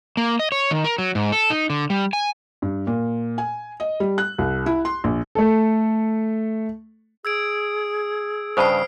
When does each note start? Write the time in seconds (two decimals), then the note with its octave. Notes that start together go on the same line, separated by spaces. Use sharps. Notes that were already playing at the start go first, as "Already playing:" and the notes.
0.17 A#3
0.39 D#5
0.52 C#5
0.71 D#3
0.84 A#4
0.98 F#3
1.15 G#2
1.32 A4
1.50 D#4
1.70 D3
1.90 G3
2.13 G#5
2.62 G2
2.87 A#2
3.38 G#5
3.80 D#5
4.00 G3
4.18 F#6
4.38 C2
4.66 E4
4.85 C6
5.04 A#1
5.35 A3 A4
7.25 G#4 E6 G#6 D7
8.57 G2 C#3 C5 A5 D#6 F6 C7